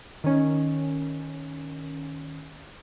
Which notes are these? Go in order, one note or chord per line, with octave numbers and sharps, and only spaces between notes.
D#3 C#4